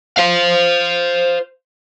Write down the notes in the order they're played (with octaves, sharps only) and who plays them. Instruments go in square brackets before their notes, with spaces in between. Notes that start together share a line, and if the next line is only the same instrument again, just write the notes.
[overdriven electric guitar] C5 F5